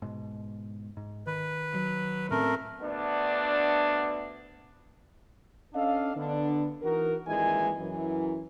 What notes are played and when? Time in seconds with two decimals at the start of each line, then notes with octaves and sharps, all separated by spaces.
0.02 G#2 B2
0.97 G#2
1.27 D#3 B4
1.75 F#3
2.31 A2 A3 C4 C#4 A#4
2.81 D2 B3 D4
5.73 C#4 D4 A4 D#5 F5
6.15 D3 B3 D4
6.82 E3 D#4 F#4 A#4
7.26 G#1 G2 A#2 E3 G#3 G#5
7.77 F#2 E3